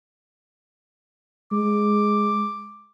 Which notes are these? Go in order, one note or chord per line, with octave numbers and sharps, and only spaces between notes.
G#3 D6